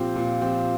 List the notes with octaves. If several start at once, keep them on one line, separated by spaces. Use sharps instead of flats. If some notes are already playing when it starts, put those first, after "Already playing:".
Already playing: A#2 F3 C4 G4
A#2
F3 C4 G4